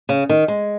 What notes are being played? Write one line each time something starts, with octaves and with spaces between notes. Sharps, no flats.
C#3
D#3
G#3